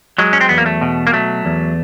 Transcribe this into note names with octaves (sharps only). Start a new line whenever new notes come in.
F#3 G#3
C#4
C4
E2 B3
A#3
A3
B2
A#3
F#3 A3
E2